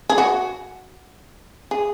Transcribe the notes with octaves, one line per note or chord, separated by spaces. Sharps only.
G#4
F#4
G#4